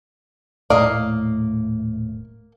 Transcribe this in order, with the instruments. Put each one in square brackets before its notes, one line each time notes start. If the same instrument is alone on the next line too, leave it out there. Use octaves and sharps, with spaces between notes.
[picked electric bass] D#1 A2 [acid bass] A3 [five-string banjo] A#3 D#5 F5 [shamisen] D5